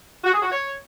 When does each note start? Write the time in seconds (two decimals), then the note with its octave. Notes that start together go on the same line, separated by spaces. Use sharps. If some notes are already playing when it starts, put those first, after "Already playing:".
0.24 F#4
0.33 G#4
0.42 F#4
0.51 C#5